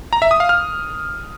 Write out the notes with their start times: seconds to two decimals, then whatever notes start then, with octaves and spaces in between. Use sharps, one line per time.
0.13 A#5
0.22 E5
0.31 D#6
0.40 F5
0.49 F6